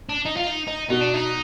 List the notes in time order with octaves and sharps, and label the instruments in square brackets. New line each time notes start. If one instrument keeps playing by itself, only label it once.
[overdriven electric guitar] D4
D#4
F4
D#4
D#4
[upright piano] B2 [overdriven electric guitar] D#4
[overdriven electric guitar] D4
D#4